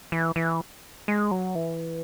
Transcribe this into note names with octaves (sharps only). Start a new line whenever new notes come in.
E3
E3
G#3
F#3
E3